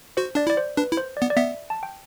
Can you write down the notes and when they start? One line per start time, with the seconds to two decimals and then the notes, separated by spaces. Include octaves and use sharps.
0.17 F#4 C5
0.35 D4 D5
0.47 E4 D5
0.57 C5
0.77 D4 B4
0.92 E4
0.97 C5
1.17 D5
1.22 B3
1.30 D5
1.36 B3 E5
1.70 A5
1.83 G5